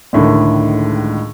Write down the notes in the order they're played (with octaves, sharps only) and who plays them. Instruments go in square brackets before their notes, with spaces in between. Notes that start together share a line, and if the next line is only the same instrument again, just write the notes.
[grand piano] C#2 A2 D3 D#3